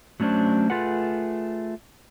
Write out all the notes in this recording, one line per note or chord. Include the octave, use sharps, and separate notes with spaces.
F#3 A3 C#4 D4 C5
A3 F4 G#4 B4 F#5